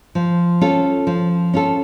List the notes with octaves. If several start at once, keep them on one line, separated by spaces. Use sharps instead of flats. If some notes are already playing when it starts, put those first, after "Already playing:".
F3
C#4 F4 A4
F3
C#4 F4 A4